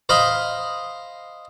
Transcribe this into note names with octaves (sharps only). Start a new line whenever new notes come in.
C5 D#5 F5 B5 C6